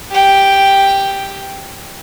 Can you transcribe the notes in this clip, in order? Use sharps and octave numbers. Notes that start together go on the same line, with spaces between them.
G4 G5